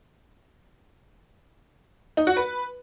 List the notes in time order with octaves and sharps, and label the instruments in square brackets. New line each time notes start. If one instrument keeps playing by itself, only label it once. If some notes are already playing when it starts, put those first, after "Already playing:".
[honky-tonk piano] D#4
F#4
B4